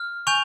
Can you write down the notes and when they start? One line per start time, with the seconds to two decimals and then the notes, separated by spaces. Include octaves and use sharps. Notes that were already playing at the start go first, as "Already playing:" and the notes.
Already playing: F6
0.27 G#5 C#6 G6 F7